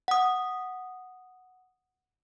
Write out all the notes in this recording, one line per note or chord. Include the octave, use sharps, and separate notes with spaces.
F#5 D#6